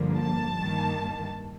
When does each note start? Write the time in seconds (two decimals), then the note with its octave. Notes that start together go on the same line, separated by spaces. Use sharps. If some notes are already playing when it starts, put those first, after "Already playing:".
Already playing: G2 D3 F3 A#3
0.18 A5
0.58 G2 D#3 A#3